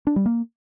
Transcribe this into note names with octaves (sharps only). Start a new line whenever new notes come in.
D4
G3
A#3